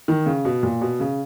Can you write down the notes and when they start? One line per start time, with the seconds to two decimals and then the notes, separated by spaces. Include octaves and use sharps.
0.08 D#3
0.26 C#3
0.45 B2
0.63 A#2
0.81 B2
1.00 C#3